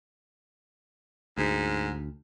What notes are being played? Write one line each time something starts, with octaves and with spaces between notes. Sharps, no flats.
D2 G#2